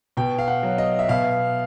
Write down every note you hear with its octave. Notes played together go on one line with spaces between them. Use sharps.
B2 G5
F5
F#5
F#3
D#5
E5
B2 F5